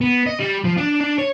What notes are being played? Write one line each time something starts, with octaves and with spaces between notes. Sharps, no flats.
B3
D#5
G3
F3
D4
D4
C#5